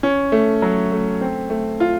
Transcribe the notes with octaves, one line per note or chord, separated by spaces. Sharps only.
C#4
A3
F#3
A3
C4
A3
F4